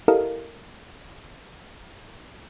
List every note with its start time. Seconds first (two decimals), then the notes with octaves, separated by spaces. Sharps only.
0.08 E4 G4 A4 A#4 D#5 F5